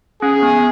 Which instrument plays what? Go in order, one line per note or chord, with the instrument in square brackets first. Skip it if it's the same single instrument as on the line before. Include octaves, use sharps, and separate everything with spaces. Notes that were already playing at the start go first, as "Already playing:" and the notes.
[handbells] C#4 [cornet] G#4
[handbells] B3